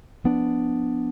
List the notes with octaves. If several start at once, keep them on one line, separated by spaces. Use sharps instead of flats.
F3 B3 D4